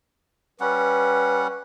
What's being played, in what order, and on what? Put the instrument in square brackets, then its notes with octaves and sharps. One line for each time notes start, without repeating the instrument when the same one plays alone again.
[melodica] G3 C#4 F#5 [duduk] B4